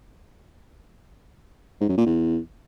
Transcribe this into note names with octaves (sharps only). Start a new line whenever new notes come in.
G#2
F#2
A#2
E2